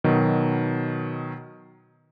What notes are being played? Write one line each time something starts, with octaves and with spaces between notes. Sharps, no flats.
B2 D#3 F#3